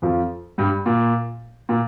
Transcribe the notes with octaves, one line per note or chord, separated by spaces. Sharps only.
F2 F3
G2 G3
A#2
A#2